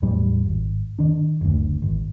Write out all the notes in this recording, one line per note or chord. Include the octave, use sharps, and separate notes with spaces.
E2 A2 F#3 G3
G#1
D#3 D4
F#1 D2
G#1